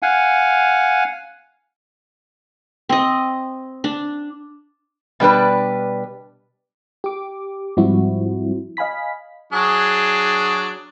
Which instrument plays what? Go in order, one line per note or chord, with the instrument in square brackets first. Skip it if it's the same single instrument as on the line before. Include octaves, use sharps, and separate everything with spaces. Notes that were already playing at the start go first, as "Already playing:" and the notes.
[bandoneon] F5 F#5 G#5
[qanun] C4 D#5
D4
[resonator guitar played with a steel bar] B2 G3 D4 B4
[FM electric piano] G4 D6
G#2 F3 G3 C4 E4 F#4
D#5 F5 G#5 B5 B6
[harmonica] F#3 D4 G#4